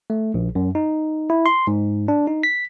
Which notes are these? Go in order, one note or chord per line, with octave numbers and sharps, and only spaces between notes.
A3
A#1
F#2
D#4
E4
C6
G#2
D4
D#4
B6